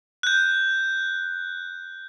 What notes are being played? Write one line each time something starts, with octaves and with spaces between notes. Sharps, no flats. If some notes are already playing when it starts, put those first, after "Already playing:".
F#6 G6